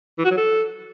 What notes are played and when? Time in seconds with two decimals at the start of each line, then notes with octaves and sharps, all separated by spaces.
0.19 E3
0.25 F#4
0.31 F#3
0.37 A4